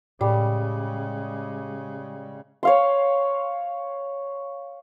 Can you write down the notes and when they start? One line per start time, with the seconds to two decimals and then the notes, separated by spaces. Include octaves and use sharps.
0.21 A2 C#3 G3 G#3
2.63 C#5 F5 C6